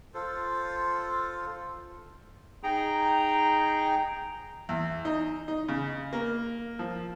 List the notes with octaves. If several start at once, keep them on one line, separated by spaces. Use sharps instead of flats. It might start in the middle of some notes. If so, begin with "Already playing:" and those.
F4 A4 C5
D#4 G#4 G5 A#5
E2
D#4
D#4
C#3
A#3
F3